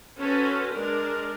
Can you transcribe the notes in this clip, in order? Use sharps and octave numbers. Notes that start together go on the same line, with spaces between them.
C#4 F#4 A4 B4 C5
G#3 D4 A#4